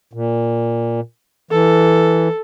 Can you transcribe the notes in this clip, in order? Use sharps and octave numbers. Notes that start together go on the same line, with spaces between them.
A#2
E3 A4